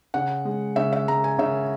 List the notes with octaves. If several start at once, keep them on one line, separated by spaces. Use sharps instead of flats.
C#3 F#5
G#3
C#3 E5
E5
G#3 A#5
G#5
C#3 E5